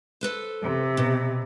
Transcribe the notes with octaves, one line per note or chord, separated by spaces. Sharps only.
A4 B4 C5
C3
B2